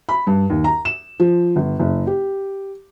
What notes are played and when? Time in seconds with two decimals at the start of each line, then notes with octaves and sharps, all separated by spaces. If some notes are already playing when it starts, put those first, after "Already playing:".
0.09 B5
0.27 G2
0.50 D#2
0.64 A#5
0.85 E7
1.20 F3
1.56 G1
1.80 F#1
2.07 G4